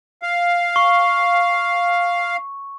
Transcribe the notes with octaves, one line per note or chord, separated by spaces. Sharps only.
F5
C#6